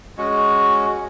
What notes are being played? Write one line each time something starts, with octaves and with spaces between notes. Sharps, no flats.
G#3 C#4 F#4